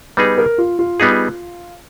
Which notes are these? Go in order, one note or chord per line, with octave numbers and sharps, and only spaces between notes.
G3 B3 D#4 G#4 B4
A#4
F4
F4
G3 B3 D#4 G#4